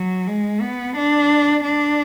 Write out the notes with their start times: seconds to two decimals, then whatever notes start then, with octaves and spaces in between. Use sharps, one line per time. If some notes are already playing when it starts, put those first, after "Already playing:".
Already playing: F#3
0.27 G#3
0.61 B3
0.96 D4
1.65 D4